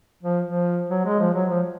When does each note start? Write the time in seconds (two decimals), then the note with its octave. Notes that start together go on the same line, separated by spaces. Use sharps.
0.23 F3
0.46 F3
0.90 F#3
1.05 G#3
1.19 F3
1.34 F#3
1.50 F3